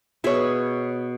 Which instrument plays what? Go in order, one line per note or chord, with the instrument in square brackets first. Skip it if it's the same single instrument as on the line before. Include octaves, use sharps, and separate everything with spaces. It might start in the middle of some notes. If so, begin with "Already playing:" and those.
[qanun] B2 G#4 E5 [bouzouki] B4 C#5